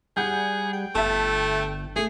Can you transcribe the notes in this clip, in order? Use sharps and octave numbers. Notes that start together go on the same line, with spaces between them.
G3 G#4 F#5 G6
G5
G1 A3 E5 A5
A3 G#4